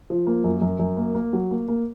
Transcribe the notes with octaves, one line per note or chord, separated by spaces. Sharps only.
F3
A#3
F#2
F#2
F#2
A#3
A#3
F#3
A#3
A#3